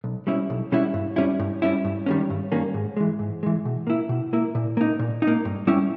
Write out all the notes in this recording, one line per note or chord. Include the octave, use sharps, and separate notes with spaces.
B1
B2 G3 C#4 E4
B1
B2 G3 C#4 E4
G2
G3 C#4 E4
G2
G3 C#4 E4
G2
D#3 G3 A#3 C#4
G2
D#3 G3 A#3 C#4
G#2
E3 G#3
G#2
E3 G#3
B2
A#3 E4
B2
A#3 E4
A#2
A#3 D#4
A#2
D#4
A#3
G2
G3 C#4 E4